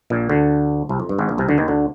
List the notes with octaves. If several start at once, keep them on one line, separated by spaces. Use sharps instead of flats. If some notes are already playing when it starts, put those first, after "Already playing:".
A#1 A#2
D2 D3
C2 C3
F2
G2
G#1 G#2
A#1 A#2
C2 C3
D2 D3
D#2 D#3
D2 D3